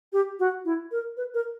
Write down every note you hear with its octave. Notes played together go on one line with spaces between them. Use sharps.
G4
F#4
E4
A#4
B4
A#4